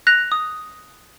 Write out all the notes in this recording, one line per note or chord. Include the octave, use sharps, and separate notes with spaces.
F#6 A#6 F7
D#6